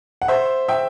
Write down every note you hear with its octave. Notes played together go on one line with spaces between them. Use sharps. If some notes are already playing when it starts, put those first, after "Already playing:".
F#5
C5 E5
E5 G5